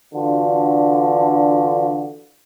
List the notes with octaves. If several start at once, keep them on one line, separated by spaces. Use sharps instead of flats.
D3 E3 D4 F4 F#4